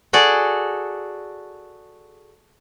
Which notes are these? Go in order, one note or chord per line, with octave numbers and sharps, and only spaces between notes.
F#4 G#4 A4 D5